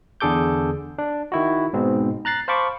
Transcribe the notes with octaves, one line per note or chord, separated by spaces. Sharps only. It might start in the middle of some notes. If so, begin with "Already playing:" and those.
E2 D3 G#4 A4 D6 G6
D4
D#3 E4 F#4
G#2 B2 C4
A#5 F#6 A6 C7
C5 F5 A5 B5 C#6 D6